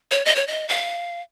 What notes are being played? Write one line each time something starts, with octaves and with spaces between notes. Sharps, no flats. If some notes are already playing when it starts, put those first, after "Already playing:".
C#5
D#5
C#5
D#5
F5